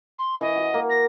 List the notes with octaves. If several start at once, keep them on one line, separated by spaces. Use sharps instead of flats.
C6
E3 D#5
F#4
A#3
A#6